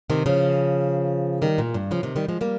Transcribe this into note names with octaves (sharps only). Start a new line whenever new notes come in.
C3 D#3
C#3 F3
D#3 G3
A#2
G2
C#3 F3
C3 D#3
D#3 G3
F3 G#3
G3 A#3